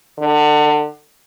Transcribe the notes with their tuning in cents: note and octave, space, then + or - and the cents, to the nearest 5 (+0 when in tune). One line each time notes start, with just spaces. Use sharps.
D3 +30